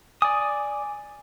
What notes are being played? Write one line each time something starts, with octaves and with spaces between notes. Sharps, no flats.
D5 G#5 D6 D#6